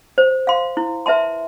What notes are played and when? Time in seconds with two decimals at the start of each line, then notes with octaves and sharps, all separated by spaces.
0.18 C5
0.47 F5 C6
0.77 E4
1.06 B4 E5 A5 C6